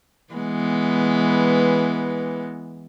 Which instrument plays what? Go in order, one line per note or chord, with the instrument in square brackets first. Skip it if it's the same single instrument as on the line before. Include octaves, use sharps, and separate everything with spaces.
[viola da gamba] E3 G#3 B3